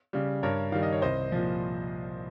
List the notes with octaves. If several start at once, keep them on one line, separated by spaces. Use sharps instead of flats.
C#3 G3
G2 A#4 C#5
D#3 G3 F5
D#5
C#5
C2 C5 D#5
A#2 F3